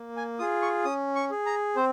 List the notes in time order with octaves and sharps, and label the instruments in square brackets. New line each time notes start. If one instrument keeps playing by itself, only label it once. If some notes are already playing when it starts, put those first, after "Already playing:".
Already playing: [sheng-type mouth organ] A#3
G#5
F4 G#4 D#6
C#6
C#4 D#6
C#6
G#4
A#5
C4 C5